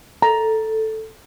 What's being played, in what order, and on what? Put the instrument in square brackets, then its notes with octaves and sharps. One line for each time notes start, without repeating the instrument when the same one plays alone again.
[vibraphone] A4 [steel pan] A#5